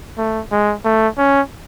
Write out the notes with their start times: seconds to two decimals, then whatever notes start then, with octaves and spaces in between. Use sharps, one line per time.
0.17 A3
0.51 G#3
0.84 A3
1.18 C#4